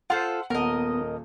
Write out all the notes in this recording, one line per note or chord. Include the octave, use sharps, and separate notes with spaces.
F4 A4 C5 F#5
D#1 B3 A#4 D#5 A5